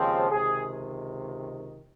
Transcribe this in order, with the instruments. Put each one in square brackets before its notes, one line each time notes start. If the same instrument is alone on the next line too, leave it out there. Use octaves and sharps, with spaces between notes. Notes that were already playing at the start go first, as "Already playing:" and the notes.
Already playing: [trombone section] D#2 C#3 F3 G#3 C4
C#2 C3 D#3 G#4